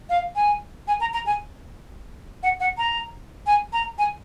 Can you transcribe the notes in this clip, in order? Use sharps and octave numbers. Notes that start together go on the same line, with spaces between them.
F5
G#5
G#5
A#5
A#5
G#5
F#5
F#5
A#5
G#5
A#5
G#5